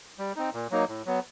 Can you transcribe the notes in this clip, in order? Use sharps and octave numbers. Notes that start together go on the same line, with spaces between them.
G3
C4 D#4
A#2
F#3 A#3 D#4
A2
F#3 B3